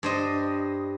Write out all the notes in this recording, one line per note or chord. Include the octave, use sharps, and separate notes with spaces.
G2 C5 D#5